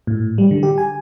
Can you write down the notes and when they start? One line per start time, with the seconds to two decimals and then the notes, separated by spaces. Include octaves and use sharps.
0.07 A2
0.38 G3
0.51 D3
0.63 G4
0.78 G#5